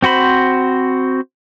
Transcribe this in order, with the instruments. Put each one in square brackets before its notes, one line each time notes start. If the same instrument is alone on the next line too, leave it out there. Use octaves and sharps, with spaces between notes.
[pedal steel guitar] C4 F#4 C5 B5